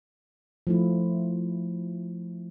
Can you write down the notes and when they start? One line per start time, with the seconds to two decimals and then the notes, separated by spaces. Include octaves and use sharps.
0.67 F3 A3 E4